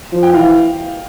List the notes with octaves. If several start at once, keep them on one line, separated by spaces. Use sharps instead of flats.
F3
G5
E3 F5